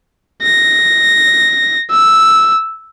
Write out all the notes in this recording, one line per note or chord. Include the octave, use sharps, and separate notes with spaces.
A#6
E6